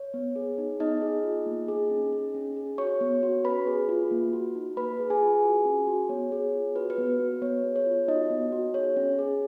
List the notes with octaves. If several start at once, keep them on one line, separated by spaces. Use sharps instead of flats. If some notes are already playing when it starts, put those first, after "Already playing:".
Already playing: C#5
B3
G#4
D#4
B3 D#4 D#5
G#4
F4
A#3
G#4
C#4
G#4
C#4
G#4
F#4 C#5 C#6
B3
F#4
C#4 B4 B5
G#4
F4
A#3
F#4
D#4
A#3 B4 B5
G#4
G#4 G#5
F4
F#4
C#4
F#4
B3 C#5
G#4
F4
F#4 B4
B4
B3
F#4
B3 C#5
G#4
C#5
F4
D#4 F#4 D#5
B3
F#4
G#4 C#5
C#4
G#4